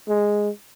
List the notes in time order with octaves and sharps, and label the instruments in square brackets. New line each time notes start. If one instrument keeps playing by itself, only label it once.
[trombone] G#3